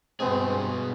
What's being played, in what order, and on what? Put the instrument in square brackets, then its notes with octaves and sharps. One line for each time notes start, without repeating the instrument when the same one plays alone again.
[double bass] G2 [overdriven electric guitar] B2 G#4 [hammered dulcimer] G#3 B3 [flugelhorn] C4